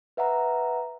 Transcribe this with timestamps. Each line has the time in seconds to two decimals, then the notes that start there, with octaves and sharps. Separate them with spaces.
0.17 B4 E5 F#5 A#5